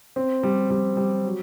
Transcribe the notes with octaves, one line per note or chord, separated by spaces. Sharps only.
C4
G3
G3
G3
F#3